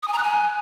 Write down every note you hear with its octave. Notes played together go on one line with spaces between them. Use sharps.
D#6
G#5
A#5
F#6
G#5